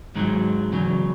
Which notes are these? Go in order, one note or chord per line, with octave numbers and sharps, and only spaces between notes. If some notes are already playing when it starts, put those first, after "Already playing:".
G#2 D#3 F#3 G#3
E2 C#3 F#3